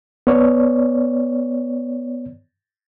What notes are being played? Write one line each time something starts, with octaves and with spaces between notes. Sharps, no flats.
B3 C#5 D5